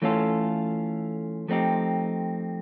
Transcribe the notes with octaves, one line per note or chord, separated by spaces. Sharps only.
E3 A3 C#4 F4 A4
F3 A3 C4 D#4 G4